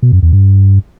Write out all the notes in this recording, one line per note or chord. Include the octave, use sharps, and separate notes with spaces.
B2
F#2
E2
G2